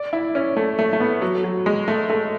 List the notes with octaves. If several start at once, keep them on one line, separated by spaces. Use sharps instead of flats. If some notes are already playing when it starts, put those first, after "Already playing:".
Already playing: D5
E4
C#4
A3
A3
A3
B3
F#3
F#3
G#3
A3
A3